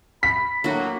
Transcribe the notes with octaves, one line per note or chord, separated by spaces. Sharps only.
B5 B6
A2 F#3 A#3 D4 F#4